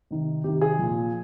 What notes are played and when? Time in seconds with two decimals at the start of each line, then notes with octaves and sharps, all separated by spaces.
0.11 C3 D#3
0.44 C3 D#3 G4
0.61 G#4
0.79 A#2 F3